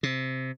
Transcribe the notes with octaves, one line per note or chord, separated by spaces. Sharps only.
C3